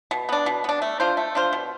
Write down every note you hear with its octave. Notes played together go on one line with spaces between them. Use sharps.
B2
B3 D4
B2
B3 D4
A3
D4 F4 C5
A3
D4 F4 C5
B2